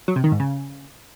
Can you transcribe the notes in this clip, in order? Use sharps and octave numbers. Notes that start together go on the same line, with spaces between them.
F#3
C3
D#3
G#2
C#3